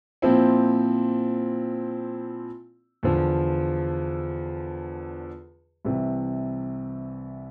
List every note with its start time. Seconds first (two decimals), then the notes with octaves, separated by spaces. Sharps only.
0.22 A#2 F3 C4 E4
3.03 E2 D3 F3
5.85 C2 C3 E3